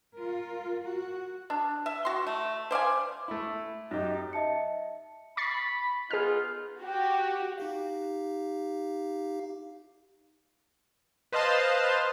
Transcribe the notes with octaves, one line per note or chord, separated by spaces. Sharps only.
F4 A#4
F#4
D4
E5
F#4 C6
A3
C5 D5 F5 G#5
A3 E4
F#2 D#4 G4
D#5 E5 A5 C#7
B5 C#6 A6 C7
B3 D#4 F4 G#4 F6
F#4 G4
D#4 G4 F5
B4 C5 D#5 F5 A5 C6